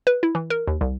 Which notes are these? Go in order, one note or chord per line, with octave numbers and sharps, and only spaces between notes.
B4
E4
E3
A#4
D#2
C2